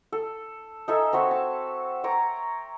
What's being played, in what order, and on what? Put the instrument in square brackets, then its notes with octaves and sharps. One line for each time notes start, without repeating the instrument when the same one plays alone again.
[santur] A4
D#4 A4 E5 G#5
C4 F#4 C#5 E5
A5
C#5 G5 A#5 D6